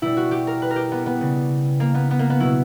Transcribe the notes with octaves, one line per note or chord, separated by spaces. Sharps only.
B2 G3 E4
F#4
G4
A#4
B4
A#4
G4
B3
B3
C#3 G3
A#3
B3
B3
A#3
B3
B2 F#3 E4